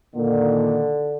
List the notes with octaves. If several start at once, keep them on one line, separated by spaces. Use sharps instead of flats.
A#2 D3 D#3 A#3